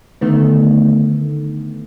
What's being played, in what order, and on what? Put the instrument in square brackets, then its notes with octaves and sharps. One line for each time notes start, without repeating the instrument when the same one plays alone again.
[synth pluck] D3 D#3 A3 B3